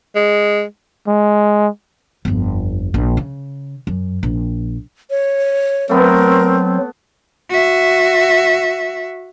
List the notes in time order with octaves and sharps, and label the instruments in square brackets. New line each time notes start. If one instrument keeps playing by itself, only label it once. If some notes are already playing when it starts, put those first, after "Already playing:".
[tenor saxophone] G#3
[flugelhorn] G#3
[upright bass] G1 F2
A#1
C#3
F#2
A#1
[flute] C#5
[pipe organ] F#3 [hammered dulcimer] A3 B3 [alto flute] C4 [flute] A#4
[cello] F#4 E5